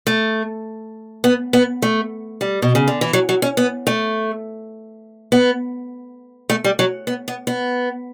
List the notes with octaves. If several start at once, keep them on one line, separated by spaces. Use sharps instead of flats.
A3
B3
B3
A3
G3
B2
C#3
D3
E3
F#3
F#3
C#4
B3
A3
B3
A3
G3
F#3
B3
B3
B3